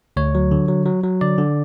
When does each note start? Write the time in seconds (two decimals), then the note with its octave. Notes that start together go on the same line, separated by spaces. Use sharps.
0.17 D2 C#5
0.35 F#3
0.51 D3
0.69 F#3
0.86 F#3
1.04 F#3
1.21 D3 D5
1.38 D3